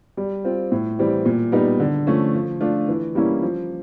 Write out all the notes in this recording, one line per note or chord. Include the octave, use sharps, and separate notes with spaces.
G3
C4 F4
A2
E3 G3 C4
A#2
G3 B3 D#4
D3
F3 A3 C#4
F3
A3 D4 F4
E3
G3 A#3 C#4 E4
F3